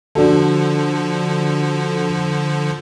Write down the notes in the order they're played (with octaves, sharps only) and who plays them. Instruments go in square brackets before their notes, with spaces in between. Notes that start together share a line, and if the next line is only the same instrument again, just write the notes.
[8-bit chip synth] D3 F3 [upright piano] D4 F#4 A4